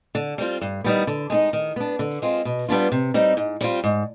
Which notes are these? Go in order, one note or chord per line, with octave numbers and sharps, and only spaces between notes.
D3
G3 C4 F4
G2
D#3 G3 B3
D3
G#3 C4 D#4
D#3
B3 D4
D3
G#3 C4 F4
B2
G3 B3 D4 F4
C3
G3 C4 D#4
G#2
G3 C4 F4
G#2